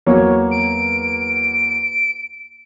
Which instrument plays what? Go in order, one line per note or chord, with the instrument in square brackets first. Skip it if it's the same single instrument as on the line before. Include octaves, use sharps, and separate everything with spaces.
[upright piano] E2 F#3 A#3 [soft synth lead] C#5
[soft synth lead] D7